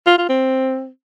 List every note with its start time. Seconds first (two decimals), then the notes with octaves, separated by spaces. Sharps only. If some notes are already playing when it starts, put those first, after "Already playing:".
0.07 F4
0.18 F4
0.29 C4